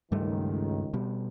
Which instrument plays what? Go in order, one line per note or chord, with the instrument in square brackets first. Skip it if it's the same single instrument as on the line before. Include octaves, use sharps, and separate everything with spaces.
[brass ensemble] C#2 D#3 [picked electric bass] G2 G3 A3
[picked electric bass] B2 G3